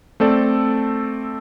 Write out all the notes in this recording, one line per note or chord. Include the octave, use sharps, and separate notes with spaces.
A3 C4 A4 D5